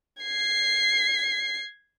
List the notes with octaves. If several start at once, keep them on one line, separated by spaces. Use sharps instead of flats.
G#6 C7